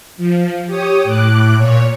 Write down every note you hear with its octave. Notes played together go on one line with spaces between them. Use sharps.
F3
G4 C#5 D#6
A2 D6 F#6
A#2 C#5